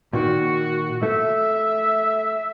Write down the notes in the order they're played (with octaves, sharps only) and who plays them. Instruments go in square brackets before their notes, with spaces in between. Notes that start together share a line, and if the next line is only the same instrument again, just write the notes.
[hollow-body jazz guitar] A#2 D#3 [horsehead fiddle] F#4
[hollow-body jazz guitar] A3 [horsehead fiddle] E5